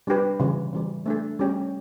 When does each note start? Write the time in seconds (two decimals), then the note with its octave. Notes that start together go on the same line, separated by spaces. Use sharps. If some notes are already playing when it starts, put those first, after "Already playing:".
0.07 G3 D4 G4 B4
0.40 C#3 E3 G3
0.73 C#3 E3 G3
1.06 A3 D4 A4
1.39 G3 C#4 G4 C#5